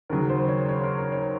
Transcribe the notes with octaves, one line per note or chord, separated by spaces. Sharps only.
D#2 C#3 F#3 A#4
C5
C#5
C#5
A#4
A#4
C#5